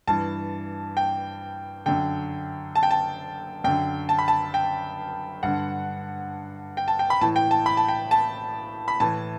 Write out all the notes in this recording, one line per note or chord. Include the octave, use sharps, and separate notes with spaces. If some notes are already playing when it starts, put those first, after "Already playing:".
G2 E3 A5
G5
F#2 D3 G5
A5
G5
A5
F#2 D3 G5
A5
B5
A5
G5
G2 D3 F#5
G5
A5
G5
B5
A2 E3 A5
G5
A5
B5
A5
G5
A5
B5
A2 E3 A5